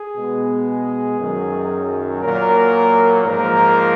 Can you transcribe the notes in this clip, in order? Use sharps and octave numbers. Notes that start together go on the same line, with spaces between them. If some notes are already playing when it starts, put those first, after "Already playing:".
Already playing: G#4
B2 G#3 B3
G#4
F#2 D#3 F#3
A#2 F#3 A#3 A#4
G#2 F3 A#3 A#4